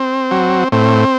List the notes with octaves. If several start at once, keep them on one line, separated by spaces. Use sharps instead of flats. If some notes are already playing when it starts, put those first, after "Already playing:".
Already playing: C4
F#3
A2 C4